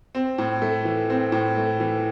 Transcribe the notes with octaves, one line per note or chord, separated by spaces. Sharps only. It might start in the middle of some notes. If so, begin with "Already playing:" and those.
C4
A2
A3
E3
C4
A2
A3
E3